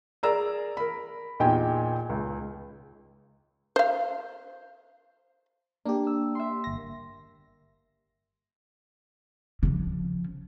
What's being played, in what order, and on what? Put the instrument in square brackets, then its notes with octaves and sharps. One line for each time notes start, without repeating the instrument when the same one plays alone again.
[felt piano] G#4 A#4 D5 A#5 E6
A#4 B5
E2 A#2 D#4 G4 G5 G#5
C#2
[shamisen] C5 F5
[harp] A#3 [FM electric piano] D4 G4
[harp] E6
E5 C6
[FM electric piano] G1 A#6
[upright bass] C#3 F3